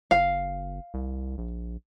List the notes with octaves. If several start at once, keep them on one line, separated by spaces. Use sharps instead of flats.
F#1 F5
C2
A#1